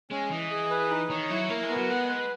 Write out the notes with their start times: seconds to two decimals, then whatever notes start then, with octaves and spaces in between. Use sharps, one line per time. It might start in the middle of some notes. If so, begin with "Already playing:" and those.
0.11 G#3 C#4
0.31 E3 D#5
0.51 G#4
0.70 B4
0.90 D#4
1.10 D#3 C#5
1.30 F#3 E4
1.50 A#3 A#4
1.63 G#3
1.69 B3
1.77 F#3
1.89 G#3 F#5
2.09 B4